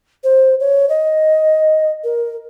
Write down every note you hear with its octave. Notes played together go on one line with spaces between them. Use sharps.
C5
C#5
D#5
A#4